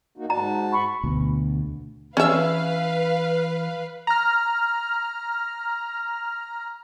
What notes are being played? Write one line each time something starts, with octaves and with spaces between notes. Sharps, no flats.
A#3 D#4 F#4
G#2 F#4 A5 A#5
B5 C#6
D2 B2
E3 C#4 B4 E5 F5
A#5 F6